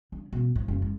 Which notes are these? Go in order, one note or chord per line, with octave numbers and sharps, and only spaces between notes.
D3
B2
A2
F#1
G#3